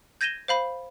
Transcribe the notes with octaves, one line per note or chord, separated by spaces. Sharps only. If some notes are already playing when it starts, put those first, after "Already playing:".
G6 G#6 A#6 D#7 E7 G7
C5 F5 B5